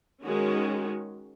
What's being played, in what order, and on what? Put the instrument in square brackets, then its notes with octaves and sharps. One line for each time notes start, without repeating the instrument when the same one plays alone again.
[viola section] D#3 G#3 C#4 F#4